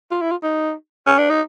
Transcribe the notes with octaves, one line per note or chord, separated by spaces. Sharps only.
F4
E4
F4
D#4
C#4
D4
D#4